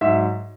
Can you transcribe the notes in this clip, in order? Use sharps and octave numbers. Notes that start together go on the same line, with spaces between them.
G#2 F#3 E5